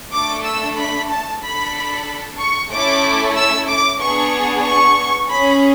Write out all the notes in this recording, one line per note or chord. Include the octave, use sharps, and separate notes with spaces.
A3 D4 A4 D6
E6
B5
A5
D4 A4 B5
C#6
A3 C#4 E4 A4 D6
E6
D6
B3 D4 G#4 C#6
C#6
C#4 G#4 B5